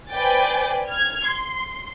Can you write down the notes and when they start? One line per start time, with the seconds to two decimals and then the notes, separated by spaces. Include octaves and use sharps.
0.12 B4 C5 D5 G5 G#5 A6
0.87 F6 G#6
1.26 C6